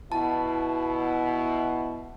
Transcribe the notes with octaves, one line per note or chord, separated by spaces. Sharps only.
B2 E4 A5